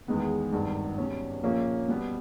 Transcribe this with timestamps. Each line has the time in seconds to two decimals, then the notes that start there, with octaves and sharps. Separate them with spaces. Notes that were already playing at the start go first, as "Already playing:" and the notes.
0.08 E2 D#3 G#3 B3
0.52 G#1 G2 D#3
0.98 B2 G3 C#4
1.43 A#1 A#2 A#3 C#4
1.88 B2 G3 B3